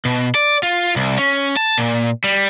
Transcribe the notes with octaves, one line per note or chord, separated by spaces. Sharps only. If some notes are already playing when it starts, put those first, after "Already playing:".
B2
D5
F4
C2
C#4
A5
A#2
G3